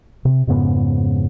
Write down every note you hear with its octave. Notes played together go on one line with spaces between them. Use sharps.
C3
F2 G#2 C#3 B3